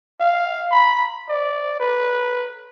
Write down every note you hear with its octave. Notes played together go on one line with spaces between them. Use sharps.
F5
B5
D5
B4